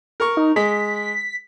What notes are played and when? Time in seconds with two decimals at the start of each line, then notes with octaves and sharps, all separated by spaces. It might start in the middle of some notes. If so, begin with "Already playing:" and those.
0.20 A#4 C#6
0.37 D#4
0.56 G#3 B6